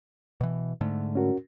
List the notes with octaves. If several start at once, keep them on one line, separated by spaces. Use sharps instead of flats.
B2 E3
G#2 D3 A3
C#4 F#4 A#4